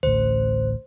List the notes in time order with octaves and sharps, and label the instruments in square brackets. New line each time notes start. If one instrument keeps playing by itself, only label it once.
[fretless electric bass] A1 D2 [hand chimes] C5